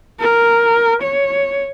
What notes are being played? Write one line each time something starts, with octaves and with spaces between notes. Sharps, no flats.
A#4
C#5